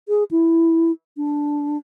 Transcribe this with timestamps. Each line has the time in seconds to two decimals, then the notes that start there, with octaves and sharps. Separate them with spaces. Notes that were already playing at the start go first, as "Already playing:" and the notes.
0.09 G#4
0.31 E4
1.17 D4